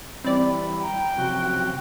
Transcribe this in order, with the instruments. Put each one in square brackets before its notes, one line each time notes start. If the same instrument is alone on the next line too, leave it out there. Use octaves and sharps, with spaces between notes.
[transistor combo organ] E3 G3 [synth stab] C4 D5 [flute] B5
[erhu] G5 [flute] A#5
[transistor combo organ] F#2 C3 F3 [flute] F#4